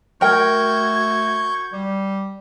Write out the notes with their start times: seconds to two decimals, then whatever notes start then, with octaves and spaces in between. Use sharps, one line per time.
0.21 A3 F#4 A#4 G5 C#6 G6 G#6
1.73 G3